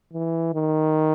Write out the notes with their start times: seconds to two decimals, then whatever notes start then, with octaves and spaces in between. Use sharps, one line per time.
0.13 E3
0.54 D#3